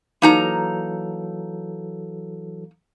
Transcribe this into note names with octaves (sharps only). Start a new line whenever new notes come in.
E3 F#3 A#3 D#4 A4 A#5